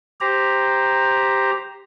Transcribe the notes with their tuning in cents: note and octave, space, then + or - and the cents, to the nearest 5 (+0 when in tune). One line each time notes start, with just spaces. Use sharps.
G4 +5 C5 +0 A#5 +0